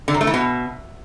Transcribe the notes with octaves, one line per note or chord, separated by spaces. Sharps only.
D3
F#2
A3
E3
B2